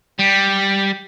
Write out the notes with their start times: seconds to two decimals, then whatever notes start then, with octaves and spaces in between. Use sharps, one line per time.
0.19 G3